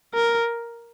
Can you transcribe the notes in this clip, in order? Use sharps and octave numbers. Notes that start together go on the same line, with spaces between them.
A#4